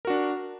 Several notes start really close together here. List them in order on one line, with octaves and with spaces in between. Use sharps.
A#4 F#4 D4